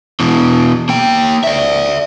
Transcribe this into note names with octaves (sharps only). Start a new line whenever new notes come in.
B2 E3
A#3 G5
D5 E5